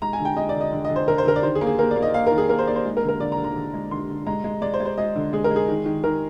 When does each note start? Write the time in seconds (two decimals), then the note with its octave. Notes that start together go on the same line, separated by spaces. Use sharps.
0.02 G#3 A#5
0.13 G#5
0.19 D3
0.25 G5
0.37 G#3 D#5
0.49 D5
0.55 D3
0.61 D#5
0.73 D3
0.85 D#5
0.90 D3
0.96 C5
1.08 D3 A#4
1.18 C5
1.25 D3 A#4
1.36 D5
1.43 D#3 C5
1.55 G#4
1.61 A#3
1.67 G#4
1.79 A#3 A#4
1.91 D5
1.96 A#3
2.02 D#5
2.14 A#3 F5
2.27 D#3 A#4
2.38 G#4
2.49 A#3 A#4
2.59 C5
2.67 A#3 D5
2.76 C5
2.85 G#3
2.97 A#4
3.03 D3
3.09 A#4
3.20 D3 D5
3.32 A#5
3.38 D3
3.44 A#5
3.56 D3
3.74 G#3
3.91 D3 C6
4.09 D3
4.26 G#3 A#5
4.44 G#3
4.62 G#3 D5
4.74 C5
4.80 G#3
4.86 C5
4.98 G#3 D#5
5.16 D3
5.33 G#3 G#4
5.44 A#4
5.51 G#3
5.56 G#4
5.68 D#3
5.86 D#3
6.04 D#3 A#4